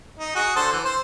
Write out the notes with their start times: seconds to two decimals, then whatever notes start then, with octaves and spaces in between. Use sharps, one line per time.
0.19 D#4
0.35 F#4 G#4
0.56 D3 A4 C5
0.72 E3
0.85 C5